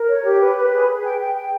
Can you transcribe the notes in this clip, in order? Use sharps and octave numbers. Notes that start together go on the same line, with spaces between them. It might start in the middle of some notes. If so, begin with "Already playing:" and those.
Already playing: A#4
C#5
G4
B4
B4
G#4
G#4
G5
G5
G5